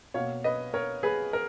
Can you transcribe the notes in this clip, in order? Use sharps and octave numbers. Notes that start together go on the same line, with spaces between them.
B2 A#3 C#5 F5
B4 D#5
A#4 C#5
G#4 B4
A#4